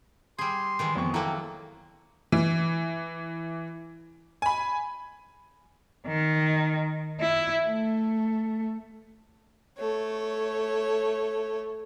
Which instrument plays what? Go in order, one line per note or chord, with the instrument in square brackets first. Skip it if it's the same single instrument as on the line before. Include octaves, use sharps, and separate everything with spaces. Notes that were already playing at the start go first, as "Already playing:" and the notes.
[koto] G3 G#4 [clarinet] C6
[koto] D#3 E3 G#3
[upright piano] F2 F3 C#6 [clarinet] B3
[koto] F#3 A#3 [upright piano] E4 A4 G5 [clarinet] A#5
[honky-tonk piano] E3
G#5 B5
[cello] D#3
E4
A3
[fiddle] A3 C#5